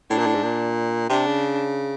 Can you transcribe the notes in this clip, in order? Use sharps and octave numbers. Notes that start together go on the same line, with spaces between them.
A2 D4
A#2
A2
G#2
A#2
C3 D4
C#3